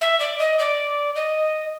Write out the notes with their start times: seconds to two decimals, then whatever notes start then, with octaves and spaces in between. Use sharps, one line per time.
0.01 E5
0.20 D5
0.39 D#5
0.59 D5
1.15 D#5